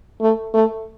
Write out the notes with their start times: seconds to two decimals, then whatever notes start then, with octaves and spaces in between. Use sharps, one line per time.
0.21 A3
0.54 A3